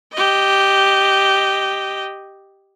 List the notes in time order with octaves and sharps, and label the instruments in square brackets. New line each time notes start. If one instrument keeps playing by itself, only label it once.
[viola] G4 D#5